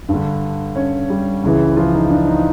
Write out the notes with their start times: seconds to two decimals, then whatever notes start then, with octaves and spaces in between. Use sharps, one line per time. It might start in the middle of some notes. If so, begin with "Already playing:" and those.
0.09 G2
0.14 D3
0.76 C#4 C#5
1.10 G3 G4
1.43 C#2 C#3 E3
1.77 F3 F4
1.93 D#4
2.11 D4
2.27 D#4